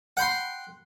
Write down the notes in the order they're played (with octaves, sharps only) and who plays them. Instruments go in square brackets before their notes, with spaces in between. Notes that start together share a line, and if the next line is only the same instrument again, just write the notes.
[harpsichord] F#5 G5 B5 C6